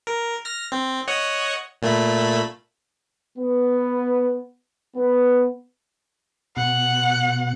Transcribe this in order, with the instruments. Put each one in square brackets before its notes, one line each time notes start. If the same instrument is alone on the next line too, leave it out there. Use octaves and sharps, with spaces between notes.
[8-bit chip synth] A#4
F6 A#6
C4
C#5 D#5 F#5
A#2 A3 B5
[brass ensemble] B3
B3
[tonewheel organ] B2 [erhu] F#5